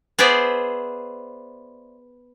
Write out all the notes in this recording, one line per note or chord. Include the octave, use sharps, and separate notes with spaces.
B3 G#4 B4 C5 D5 E5